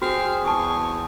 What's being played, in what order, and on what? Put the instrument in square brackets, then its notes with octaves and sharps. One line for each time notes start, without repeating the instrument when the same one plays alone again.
[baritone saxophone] C4 [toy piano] F#4 [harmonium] G#4 [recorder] F6
[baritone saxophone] E2 [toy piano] A5 D#6 [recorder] C#6